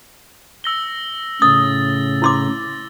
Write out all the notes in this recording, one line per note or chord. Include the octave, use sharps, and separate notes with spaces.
E6 A#6 G7
A2 C#3 D#6 A6
E4 C6 D6